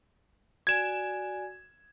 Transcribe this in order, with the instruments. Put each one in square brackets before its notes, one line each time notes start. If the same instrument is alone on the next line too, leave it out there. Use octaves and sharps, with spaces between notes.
[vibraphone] F#4 D5 G#5 [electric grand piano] G#6 E7